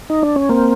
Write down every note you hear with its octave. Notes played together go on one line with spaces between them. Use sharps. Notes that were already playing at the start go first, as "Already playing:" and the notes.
D#4
D4
C#4
A#3 C4